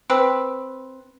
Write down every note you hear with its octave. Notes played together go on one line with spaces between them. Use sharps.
C4 B4